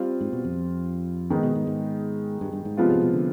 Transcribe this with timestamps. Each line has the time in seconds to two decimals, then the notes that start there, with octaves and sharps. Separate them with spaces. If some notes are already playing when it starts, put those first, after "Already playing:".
Already playing: G3 C4 F4
0.21 G#2
0.32 B2
0.45 F2
1.30 G#2 D#3 G#3 B3 D#4
1.43 B2
1.55 G#2
1.67 G#2
2.41 G2
2.53 G2
2.65 G#2
2.77 C3 F3 G#3 B3 F4
2.90 G#2
3.02 B2
3.14 D3